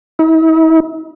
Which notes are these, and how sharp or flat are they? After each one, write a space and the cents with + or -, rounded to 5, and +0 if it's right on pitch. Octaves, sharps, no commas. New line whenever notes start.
E4 -45